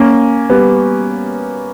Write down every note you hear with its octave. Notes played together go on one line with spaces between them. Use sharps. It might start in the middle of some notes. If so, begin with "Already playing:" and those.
Already playing: A#3 C#4
G3 B3